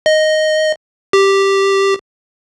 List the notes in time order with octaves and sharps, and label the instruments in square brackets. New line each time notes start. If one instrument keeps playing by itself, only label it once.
[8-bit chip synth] D#5
G4